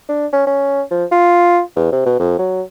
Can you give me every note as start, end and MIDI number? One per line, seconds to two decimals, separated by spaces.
0.09 0.27 62
0.33 0.42 61
0.47 0.82 61
0.91 1.05 53
1.11 1.61 65
1.76 1.89 40
1.92 2.02 48
2.06 2.18 47
2.20 2.38 41
2.39 2.62 54